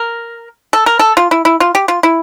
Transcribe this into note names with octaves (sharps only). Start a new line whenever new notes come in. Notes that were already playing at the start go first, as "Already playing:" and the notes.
Already playing: A#4
A4
A#4
A4
F4
E4
E4
F4
G4
F4
E4